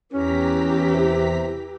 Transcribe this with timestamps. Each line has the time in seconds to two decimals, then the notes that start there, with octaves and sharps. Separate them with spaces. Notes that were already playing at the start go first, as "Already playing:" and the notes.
0.13 E2 E3 C#4 G4 A#5 B6
0.93 C3